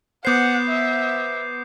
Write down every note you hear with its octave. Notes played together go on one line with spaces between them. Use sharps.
B3 C5 F#5 D6 G6 C7
E5